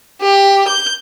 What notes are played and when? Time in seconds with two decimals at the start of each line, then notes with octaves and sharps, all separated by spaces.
0.22 G4
0.67 G6